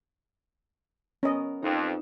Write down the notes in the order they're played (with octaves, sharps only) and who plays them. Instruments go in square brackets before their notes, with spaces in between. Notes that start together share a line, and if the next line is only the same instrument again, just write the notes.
[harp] B3 A#4 [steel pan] C#4 D#5
[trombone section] F2 [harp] D#4 E7